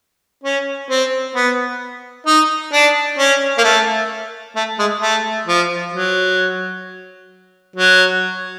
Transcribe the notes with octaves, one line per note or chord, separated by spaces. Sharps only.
C#4
C4
B3
D#4
D4
C#4
A#3
A3
A3
G#3
A3
F3
F#3
F#3